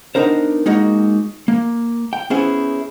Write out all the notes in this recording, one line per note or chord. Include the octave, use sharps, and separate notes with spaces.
B3 D4 D#4 A#4 C5
G#3 A#3 D#4 F#4
A#3
G5
B3 C#4 E4 G#4 C5